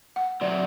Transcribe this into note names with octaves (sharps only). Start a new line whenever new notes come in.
F#5
C3 F#3 C4 D5